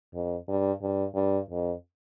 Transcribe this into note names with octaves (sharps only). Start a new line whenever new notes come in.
F2
G2
G2
G2
F2